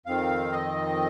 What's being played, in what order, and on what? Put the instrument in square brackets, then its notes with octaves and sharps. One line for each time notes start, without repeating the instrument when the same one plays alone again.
[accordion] F2 D#3 C4 F5
D#5